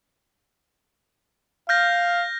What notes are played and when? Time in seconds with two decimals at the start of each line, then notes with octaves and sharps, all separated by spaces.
1.69 F5 F6 G6 A#6